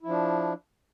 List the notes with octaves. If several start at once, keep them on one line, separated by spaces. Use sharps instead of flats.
F3 D4 E4